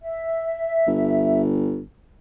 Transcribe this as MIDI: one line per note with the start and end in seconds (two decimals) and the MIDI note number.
0.02 1.40 76
0.87 1.83 31